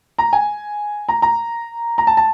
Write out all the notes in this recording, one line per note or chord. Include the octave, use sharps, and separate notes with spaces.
A#5
G#5
A#5
A#5
A#5
A5
A5